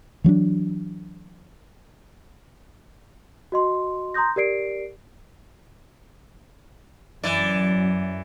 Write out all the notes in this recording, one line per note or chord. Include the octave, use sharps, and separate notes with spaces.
E3 F#3 C#4 D4
F#4 D#5 C6
A#5 C6 D#6 G6 A#6
G4 A#4 D5 C7 D7
F#2 E3 D5